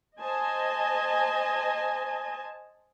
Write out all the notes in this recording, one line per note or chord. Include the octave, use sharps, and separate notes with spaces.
C5 D#5 G#5 A5